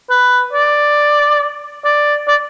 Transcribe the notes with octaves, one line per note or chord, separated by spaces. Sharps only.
B4
D5
D5
D5